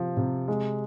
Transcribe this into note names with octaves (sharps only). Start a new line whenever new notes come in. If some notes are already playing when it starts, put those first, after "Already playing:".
Already playing: C3 F3
C3
G#3